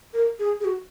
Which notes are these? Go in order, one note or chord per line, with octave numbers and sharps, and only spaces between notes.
A#4
G#4
G#4
F#4